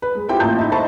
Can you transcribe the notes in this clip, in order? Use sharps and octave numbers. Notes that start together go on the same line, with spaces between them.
B4
G#3
C4 E4 F4 G4 G5
A1 A#3 F4 A5 A#5 G6
D#4 E4 E5
C5 D#5 E5 A5 B5 C#6